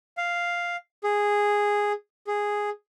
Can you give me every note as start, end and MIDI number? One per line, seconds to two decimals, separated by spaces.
0.17 0.76 77
1.04 1.92 68
2.27 2.70 68